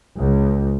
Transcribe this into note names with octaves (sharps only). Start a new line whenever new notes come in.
C#2